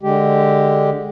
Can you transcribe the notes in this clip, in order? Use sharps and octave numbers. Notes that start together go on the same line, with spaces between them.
D3 G#3 G4